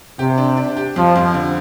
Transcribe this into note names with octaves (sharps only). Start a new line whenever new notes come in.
C3 G4
D4
D4
G4
F2 F3
F2
D3